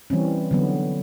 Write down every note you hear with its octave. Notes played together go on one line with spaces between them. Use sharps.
E3 G3 C4 C#4
D3 F#3 B3